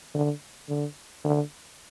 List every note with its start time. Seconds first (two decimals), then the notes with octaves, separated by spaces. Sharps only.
0.14 D3
0.69 D3
1.24 D3